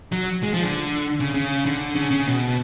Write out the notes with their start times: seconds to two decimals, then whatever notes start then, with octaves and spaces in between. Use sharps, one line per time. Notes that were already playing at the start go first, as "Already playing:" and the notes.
0.12 F#3
0.43 G#3
0.54 F3
0.63 D3
1.20 C#3
1.34 C#3
1.66 D3
1.95 C#3
2.11 C#3
2.27 B2